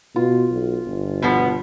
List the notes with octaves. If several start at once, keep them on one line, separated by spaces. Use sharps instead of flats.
B2 F4
B1
G1
B2 F3 B3